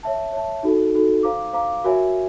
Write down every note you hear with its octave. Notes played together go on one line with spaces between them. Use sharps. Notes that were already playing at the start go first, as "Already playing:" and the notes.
C#5 E5 A5
C#5 E5 A5
D#4 F#4 A4
D#4 F#4 A4
C5 F5 A#5 D6
C5 F5 A#5 D6
F#4 A#4 C#5 E5 G#5